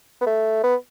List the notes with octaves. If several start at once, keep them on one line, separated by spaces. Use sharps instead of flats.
B3
A3
B3